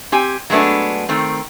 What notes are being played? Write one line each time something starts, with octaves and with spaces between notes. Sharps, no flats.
C4 G4 G#5
F#3 G#3 A3 B3 D4
D#3 A3 C4